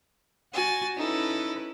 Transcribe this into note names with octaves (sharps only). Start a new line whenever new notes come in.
F#4 G#5 A6
C#4 D#4 E4 A4 B4